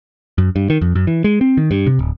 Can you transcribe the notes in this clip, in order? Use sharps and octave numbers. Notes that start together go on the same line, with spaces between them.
F#2
G2
D#3
F2
F#2
E3
G#3
C4
D#3
G2
C3
D1